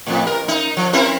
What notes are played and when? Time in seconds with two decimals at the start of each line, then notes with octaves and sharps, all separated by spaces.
0.06 F2 A2
0.27 A#4
0.48 D#4
0.77 F3
0.93 C4 E4 A#4